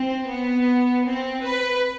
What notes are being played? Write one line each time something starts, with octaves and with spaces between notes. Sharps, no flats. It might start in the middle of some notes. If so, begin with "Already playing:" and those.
Already playing: C4
B3
C4
B4